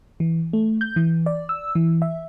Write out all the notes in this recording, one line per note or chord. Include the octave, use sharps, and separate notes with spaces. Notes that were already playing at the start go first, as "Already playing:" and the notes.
E3
A3
G6
E3
D5
E6
E3
E5